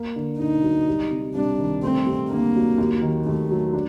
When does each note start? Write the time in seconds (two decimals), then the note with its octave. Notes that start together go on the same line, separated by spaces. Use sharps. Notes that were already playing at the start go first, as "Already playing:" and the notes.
Already playing: A#3
0.16 D3
0.39 D2 D#4
0.63 F#3
0.87 G3
1.11 C3
1.35 C2 D4
1.59 D#3
1.83 A3 C4
2.06 C3
2.30 D2 A#3
2.55 F#3
2.78 D#2
3.02 D#3
3.26 D#2 A3
3.50 F#3
3.73 D4